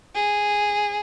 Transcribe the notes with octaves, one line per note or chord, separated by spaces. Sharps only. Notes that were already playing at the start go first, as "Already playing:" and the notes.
G#4